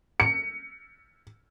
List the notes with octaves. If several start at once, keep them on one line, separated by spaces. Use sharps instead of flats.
C#7